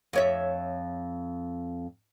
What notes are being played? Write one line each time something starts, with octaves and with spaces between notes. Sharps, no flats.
F2 C#5 E5